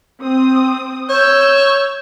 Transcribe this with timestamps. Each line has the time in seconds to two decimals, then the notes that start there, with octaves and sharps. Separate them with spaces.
0.22 C4 D#6
1.09 C#5 E6 G6